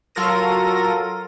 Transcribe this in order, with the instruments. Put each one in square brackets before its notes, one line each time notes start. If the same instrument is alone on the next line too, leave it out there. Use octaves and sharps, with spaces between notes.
[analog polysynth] F#3 F4 A4 A#4 A#6 D#7